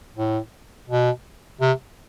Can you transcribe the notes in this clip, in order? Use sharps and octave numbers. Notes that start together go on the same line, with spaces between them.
A2
B2
C3